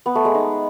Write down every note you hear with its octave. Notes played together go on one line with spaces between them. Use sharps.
B3
A3
G#3
D#4